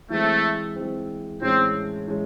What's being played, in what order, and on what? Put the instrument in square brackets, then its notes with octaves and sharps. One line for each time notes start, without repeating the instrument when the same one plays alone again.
[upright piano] E3 G#3 C4 [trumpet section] A3
[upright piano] E3 G#3 C4
[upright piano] A2 E3 G#3 C#4 [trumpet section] C4
[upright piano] A2 E3 G#3 C#4